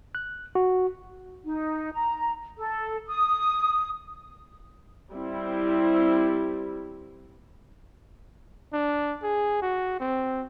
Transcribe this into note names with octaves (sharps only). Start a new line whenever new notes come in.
F#6
F#4
D#4
A#5
A4
D#6
G3 C4 E4
D4
G#4
F#4
C4